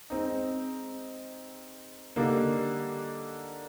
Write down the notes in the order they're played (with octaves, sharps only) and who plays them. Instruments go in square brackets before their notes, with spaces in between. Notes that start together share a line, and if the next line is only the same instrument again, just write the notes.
[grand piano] G#3 C4 D#4
D3 G3 A#3 D#4